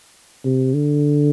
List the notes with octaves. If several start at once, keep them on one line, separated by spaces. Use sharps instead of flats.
C3
D3